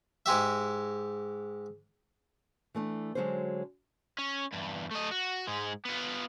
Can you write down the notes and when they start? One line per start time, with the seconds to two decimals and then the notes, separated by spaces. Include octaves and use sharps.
0.26 G#2 G#3 G4 E5
2.75 E3 A3 D4
3.15 D3 F#3 G#3 C#4 F#4 C5
4.18 C#4
4.52 E2 G2
4.91 A3 D#5
5.11 F#4
5.47 G#2 G#3
5.85 B3 F4